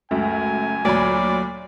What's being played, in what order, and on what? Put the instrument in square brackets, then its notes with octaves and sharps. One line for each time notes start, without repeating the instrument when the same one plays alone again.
[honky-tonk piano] C#2 F#2 [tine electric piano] A3 [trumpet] G#5
[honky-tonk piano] D2 A#2 B5 [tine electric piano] F#3 [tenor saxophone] D5